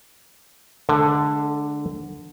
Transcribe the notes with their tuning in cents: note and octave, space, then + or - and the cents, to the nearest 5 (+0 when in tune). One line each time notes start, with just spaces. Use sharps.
D3 +5 G#3 +45 A4 +0